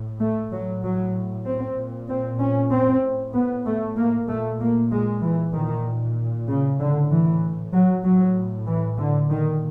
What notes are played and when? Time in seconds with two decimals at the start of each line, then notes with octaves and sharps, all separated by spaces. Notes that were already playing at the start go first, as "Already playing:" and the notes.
Already playing: A2
0.20 A3
0.52 A2 F#3
0.83 F#3
1.45 C4
1.77 A#2
2.08 C4
2.40 C#4
2.71 C4
3.02 A2
3.33 B3
3.66 A3
3.96 A#3
4.27 A#2 A3
4.60 A#3
4.90 G#3
5.22 E3
5.53 A#2 D#3
6.47 C#3
6.79 A2 D3
7.11 E3
7.73 F#3
8.03 A2 F#3
8.67 E3
8.98 D3
9.30 A#2 D#3